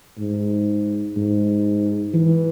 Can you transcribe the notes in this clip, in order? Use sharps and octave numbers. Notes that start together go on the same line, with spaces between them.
G#2
G#2
E3